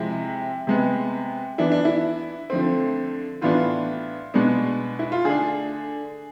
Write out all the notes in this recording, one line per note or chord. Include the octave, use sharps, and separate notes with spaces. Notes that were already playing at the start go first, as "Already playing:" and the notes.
Already playing: C3 F3 G#3 E4
C3 G#3 B3
E3 B3 D4 E4
D4
E4
D3 F3 A3 C4
A2 E3 B3 D4 F4
B2 G#3 B3 D4
E4
F4
D3 A3 D4 G#4